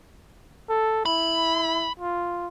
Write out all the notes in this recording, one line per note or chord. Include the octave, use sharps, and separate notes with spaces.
A4
E4 B5
F4